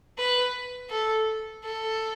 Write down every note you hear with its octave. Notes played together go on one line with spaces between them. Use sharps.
B4
A4
A4